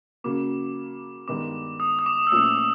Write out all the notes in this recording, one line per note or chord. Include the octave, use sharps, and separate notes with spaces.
C#3 F#3 A#3 D6
G2 D#3 G#3 B3 D6
D#6
D#6
D6
E6
A#2 F3 A3 C#4 D#6